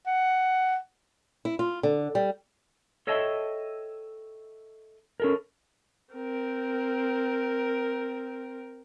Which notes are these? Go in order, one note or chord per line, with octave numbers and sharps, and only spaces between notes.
F#5
E4
F4
D3
G3
A4 C#5 D#5 E5 G5 A5
C#4 A4 A#4
C4 A#4